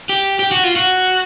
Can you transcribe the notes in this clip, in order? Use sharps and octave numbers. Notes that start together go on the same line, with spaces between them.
G4
G4
F#4
F4
F#4